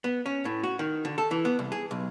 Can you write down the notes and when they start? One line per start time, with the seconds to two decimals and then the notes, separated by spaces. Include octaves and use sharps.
0.04 B3
0.26 C#4
0.45 A2
0.63 F#4
0.79 D#3
1.05 D3
1.18 A4
1.31 E3
1.45 B3
1.59 C2
1.72 G#4
1.91 B1